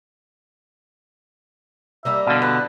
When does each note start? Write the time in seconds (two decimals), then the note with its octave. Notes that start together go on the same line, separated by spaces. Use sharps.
2.05 G3 A#3 D#4 E5
2.27 B2 D3 F5
2.42 E4 B4